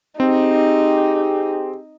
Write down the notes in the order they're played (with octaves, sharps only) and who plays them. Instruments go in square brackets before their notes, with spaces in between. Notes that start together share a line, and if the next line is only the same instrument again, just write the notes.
[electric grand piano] C4 [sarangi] D#4 [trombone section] G4 G#4